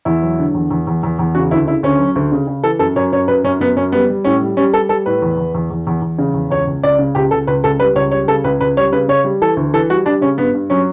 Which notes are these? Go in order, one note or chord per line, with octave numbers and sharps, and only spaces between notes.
E2 E4
F#3
D3
E2
E2
E2
E2
E2
C#3 F#4
D2 E4
C#3 E4
D2 C#4
F#3
D2
C#3
C#3
E3 A4
F#2 A4
F#2 C#5
F#2 C#5
F#2 B4
F#2 C#4
F#2 B3
F#2 C#4
G3 B3
G3
A2 C#4
G3
G3 C#4
G3 A4
G3 A4
A2 B4
E2
E2
E2
E2
E2
E2
C#3
E2
C#2 C#5
C#2
C#2 D5
C#3
C#2 G4
C#2 A4
C#2 B4
C#2 A4
G3 B4
C#2 C#5
G3 C#5
C#3 A4
C#2 B4
C#2 B4
G3 C#5
C#3 B4
C#3 C#5
G3
E3 A4
D2
E3 A4
G3 F#4
G3 D4
C#3 C#4
G2 B3
G2
F#3 C#4